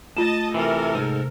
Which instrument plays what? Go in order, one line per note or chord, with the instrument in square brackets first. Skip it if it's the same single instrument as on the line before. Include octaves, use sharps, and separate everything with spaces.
[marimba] A3 [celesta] F4 E7 [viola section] D#5 A5
[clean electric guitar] C3 E3 [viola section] A4 A#4
[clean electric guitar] G#2 [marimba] C3